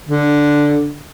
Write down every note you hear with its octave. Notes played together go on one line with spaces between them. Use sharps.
D3